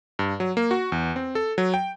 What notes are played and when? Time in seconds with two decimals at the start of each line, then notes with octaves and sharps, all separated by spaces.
0.19 G2
0.40 F#3
0.57 A#3
0.71 F#4
0.92 E2
1.16 C4
1.35 A4
1.58 F#3
1.74 G5